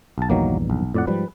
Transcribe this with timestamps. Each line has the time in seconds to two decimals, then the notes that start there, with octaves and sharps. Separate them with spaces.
0.18 B1 A5
0.30 A#1 E2 G2 D#3 F#3 A#3
0.70 B1
0.94 F2 A2 D5 F#5
1.07 G#2 F3 G3 B4